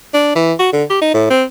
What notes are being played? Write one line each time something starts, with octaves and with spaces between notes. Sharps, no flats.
D4
E3
F#4
D3
G4
D#4
A2
C4